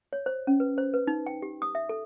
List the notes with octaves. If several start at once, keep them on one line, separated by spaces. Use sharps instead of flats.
C#5
C5
C#4
B4
C5
B4
D#4
G5
G4
D#6
E5
A4